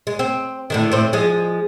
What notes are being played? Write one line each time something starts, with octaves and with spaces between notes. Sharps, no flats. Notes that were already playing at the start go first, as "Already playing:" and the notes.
G#3
C4
A2 D3 D#3
A2 C4
F3 G#3 G#4